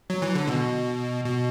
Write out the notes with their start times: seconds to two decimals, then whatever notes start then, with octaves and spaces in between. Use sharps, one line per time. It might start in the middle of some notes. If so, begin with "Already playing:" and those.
0.10 F#3
0.22 E3
0.35 D3
0.47 B2
1.25 B2